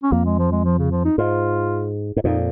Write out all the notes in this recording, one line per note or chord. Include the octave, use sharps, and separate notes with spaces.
C#4
F2 A#3
G#3
F3
G#3
F3
C#3
F3
D#4
G#2 F4
G#2
F2 A#2 D#4